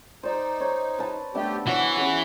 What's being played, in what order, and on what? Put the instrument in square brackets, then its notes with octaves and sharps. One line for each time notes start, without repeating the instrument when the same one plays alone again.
[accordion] D#4 [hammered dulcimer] C5 D5
[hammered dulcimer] C5 C#5
B4 A5
[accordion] A3 G4 [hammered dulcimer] B3 D4 E5
[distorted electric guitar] E3 E4 [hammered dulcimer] F#4 C#5 [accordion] F#5
[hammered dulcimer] C#4 G#4